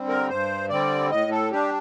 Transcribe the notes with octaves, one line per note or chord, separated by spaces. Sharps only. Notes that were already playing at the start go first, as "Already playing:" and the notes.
Already playing: D3 G3 C4
A#4
G2 C5
D3 G3 C4 D5
A2 D#5
A4
G3 D4 G4